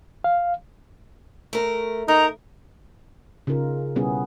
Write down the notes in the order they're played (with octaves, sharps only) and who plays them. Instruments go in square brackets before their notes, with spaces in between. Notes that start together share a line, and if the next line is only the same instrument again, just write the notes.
[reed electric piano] F5
[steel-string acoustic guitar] A3 A#4
[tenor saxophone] D#4 [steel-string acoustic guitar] A#4 [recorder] A#5
[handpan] C#3 D#4 F4 A#4
B2 G3 B3 C#4 E4 G#4